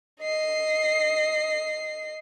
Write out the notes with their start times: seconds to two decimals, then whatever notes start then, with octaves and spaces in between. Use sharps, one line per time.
0.20 D#5 C7